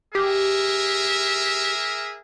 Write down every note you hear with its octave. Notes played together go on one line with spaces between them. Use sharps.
G4 G#4 A#4 E5